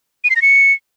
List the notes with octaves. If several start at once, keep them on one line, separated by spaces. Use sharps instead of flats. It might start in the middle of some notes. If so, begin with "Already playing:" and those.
D#7
C7
A#6
C#7